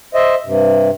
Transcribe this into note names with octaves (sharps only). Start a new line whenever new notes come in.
C5 D#5 E5
G2 C3